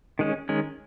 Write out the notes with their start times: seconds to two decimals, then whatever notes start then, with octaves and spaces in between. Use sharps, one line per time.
0.19 D#3 G#3 C#4
0.49 D#3 G#3 C#4